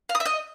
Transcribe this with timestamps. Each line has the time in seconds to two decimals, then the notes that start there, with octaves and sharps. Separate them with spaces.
0.09 F5
0.15 D#6
0.20 E5
0.26 D#5